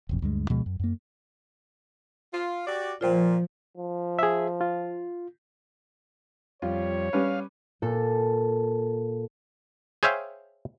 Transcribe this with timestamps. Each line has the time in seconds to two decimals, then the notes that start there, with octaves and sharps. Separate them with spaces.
0.09 E1 A1 F2
0.22 D2 G2 G#3
0.49 D2 B2 F3 G#3
0.66 F#2
0.80 F#2 A#3
2.32 F4
2.66 F#4 G4 D5
3.01 A#2 F3 F4 C5 G5
3.77 F3
4.19 G#4 E5
4.61 F4
6.62 F2 G3 F4 C#5
7.13 G3 C#4 B4 F5
7.82 A#2 A4
10.03 G#4 C5 C#5 E5 F5 G5